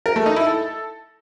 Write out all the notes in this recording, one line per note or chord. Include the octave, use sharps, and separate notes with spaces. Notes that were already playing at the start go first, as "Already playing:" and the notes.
A#4
A3
D#4
E4
A4